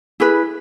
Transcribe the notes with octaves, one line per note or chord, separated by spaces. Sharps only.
E4 G#4 B4